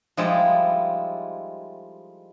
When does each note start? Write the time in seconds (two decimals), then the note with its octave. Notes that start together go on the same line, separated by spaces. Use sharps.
0.17 F3 G3 G#3 D#4 E4 A4